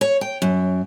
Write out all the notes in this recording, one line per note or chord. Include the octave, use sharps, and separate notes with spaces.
C#5
G5
F#2